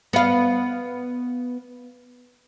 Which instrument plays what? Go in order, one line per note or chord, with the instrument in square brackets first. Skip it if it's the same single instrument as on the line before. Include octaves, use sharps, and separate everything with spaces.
[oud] B3 F5